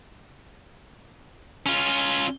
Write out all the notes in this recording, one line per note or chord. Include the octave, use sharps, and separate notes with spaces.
C#4 F4